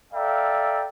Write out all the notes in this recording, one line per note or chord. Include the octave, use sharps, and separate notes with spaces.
A4 D5 E5 F5 G5 A#5